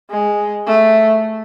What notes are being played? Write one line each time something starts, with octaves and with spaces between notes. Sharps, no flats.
G#3
A3